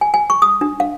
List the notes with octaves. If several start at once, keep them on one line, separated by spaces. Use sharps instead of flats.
G#5
G#5
C#6
D#6
D4
F5